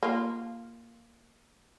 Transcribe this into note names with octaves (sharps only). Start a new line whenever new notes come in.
A#3 F4